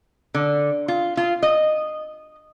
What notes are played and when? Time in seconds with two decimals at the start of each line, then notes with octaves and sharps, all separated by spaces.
0.34 D3
0.88 F4
1.17 F4
1.43 D#5